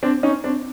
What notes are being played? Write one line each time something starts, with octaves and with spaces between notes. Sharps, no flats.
C4 D4
C#4 D#4
C4 D4